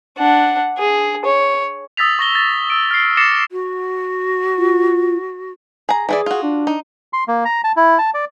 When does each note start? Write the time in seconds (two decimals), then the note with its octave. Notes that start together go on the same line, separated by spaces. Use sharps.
0.18 D4 F#5
0.78 G#4
1.25 C#5
1.97 D#6 E6 A6 B6 F7
2.19 C#6 A#6 G7
2.35 A6
2.70 E6 D7
2.91 F6 C7
3.17 D6 A6 A#6 C7 C#7 E7
3.52 F#4
4.58 F4
5.89 G#4 A#5
6.09 E3 E4 G#4 D5
6.26 F4 F#4
6.43 D4
6.67 D#4
7.13 C6
7.28 A#3
7.45 A#5
7.64 A5
7.76 E4
7.99 A5
8.14 D5